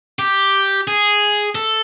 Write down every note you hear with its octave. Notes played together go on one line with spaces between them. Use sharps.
G4
G#4
A4